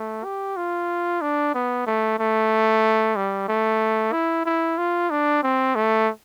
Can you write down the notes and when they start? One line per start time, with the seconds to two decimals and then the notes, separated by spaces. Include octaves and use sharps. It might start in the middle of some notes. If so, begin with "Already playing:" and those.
Already playing: A3
0.24 G4
0.57 F4
1.21 D4
1.54 B3
1.87 A3
2.19 A3
3.16 G3
3.48 A3
4.13 E4
4.46 E4
4.78 F4
5.10 D4
5.43 C4
5.75 A3